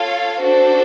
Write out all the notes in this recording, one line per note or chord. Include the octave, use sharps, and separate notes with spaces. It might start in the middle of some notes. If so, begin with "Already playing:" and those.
Already playing: F4 A4 C#5 F5
D4 F#4 A4 C5